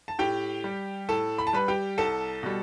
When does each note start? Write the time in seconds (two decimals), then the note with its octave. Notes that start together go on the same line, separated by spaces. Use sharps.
0.08 A5
0.19 A2 G4 G5
0.64 G3
1.09 A2 A4 A5
1.38 B5
1.47 A5
1.53 G3 B4 B5
1.68 G4 G5
1.98 C2 A4 A5
2.43 B2 G3